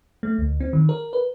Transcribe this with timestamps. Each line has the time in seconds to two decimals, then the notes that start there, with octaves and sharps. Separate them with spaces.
0.23 A3
0.38 D2
0.60 C4
0.73 D#3
0.89 A#4
1.13 B4